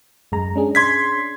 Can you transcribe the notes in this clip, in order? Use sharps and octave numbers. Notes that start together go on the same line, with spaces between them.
F#2 G#3 A#5
C#4 D4 G#4
C6 G#6 B6